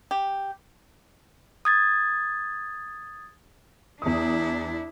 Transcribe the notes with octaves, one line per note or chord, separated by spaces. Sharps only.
G4
D#6 G#6 A6
E2 D4 E4 D#6